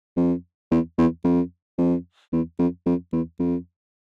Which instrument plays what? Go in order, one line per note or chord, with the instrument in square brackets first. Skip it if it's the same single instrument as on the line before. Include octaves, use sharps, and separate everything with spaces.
[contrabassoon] F2
E2
E2
F2
F2
E2
F2
F2
E2
F2